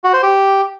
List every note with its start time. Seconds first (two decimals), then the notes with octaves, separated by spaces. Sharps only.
0.04 F#4
0.13 C5
0.23 G4